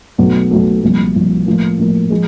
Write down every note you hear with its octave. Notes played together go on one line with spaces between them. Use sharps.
B1 B2 F#3 A3
B1 B2 F#3 A3
C2 A#2 F3
C2 A#2 F3
A2 F3 A#3
A2 F3 A#3
F3 G#3